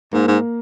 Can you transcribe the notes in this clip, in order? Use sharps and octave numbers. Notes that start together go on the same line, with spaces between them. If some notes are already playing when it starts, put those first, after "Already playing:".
G#2 A#3
G#2